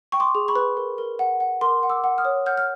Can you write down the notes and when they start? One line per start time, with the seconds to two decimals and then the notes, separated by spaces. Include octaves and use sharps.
0.12 G5 C#6
0.20 C6 D6
0.35 G#4
0.48 B5 C#6
0.56 B4
0.77 A#4
0.98 A#4
1.19 F#5
1.40 F#5
1.61 A#4 C6 D6
1.83 F#5
1.90 D6 E6
2.04 F#5
2.18 D#6 F6
2.25 C#5
2.46 F#5 F6 G6
2.58 F6